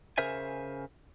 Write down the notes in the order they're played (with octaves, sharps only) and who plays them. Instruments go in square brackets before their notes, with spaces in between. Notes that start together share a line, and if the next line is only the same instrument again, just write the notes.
[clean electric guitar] C#3 A#4 C5 E5 G#5